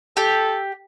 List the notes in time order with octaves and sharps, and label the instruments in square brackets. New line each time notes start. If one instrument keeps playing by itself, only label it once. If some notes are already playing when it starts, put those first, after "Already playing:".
[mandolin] G4 [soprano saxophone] A4